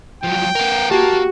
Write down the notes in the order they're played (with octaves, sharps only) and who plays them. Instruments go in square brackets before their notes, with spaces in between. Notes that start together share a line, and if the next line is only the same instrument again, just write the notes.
[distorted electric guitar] F3 F#3 [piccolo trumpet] G5
[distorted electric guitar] B3 A#4
[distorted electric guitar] A#3 [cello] F#4 [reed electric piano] G4 [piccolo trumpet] A5